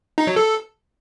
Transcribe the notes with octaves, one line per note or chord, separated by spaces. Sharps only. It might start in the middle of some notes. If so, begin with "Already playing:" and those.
D#4
F#3
A4